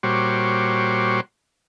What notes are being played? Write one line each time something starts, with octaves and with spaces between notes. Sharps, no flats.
A#2 G3 F#4 C5 C#5 D6